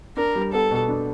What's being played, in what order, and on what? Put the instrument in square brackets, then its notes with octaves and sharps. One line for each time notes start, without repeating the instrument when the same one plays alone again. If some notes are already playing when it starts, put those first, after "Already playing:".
[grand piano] D4 [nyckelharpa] A#4
[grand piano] G3
[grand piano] B3 [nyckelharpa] A4
[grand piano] B2
D4